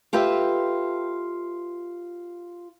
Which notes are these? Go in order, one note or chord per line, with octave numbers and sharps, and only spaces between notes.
F4 G4 A4 B4 E5